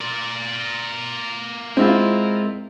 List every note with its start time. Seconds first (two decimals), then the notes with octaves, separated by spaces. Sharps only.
0.01 A#4 D5
1.77 G#3 C4 E4 F4